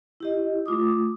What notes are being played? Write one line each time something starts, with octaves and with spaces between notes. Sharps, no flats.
E4 G4 D#5
A3 F4 D6 D#6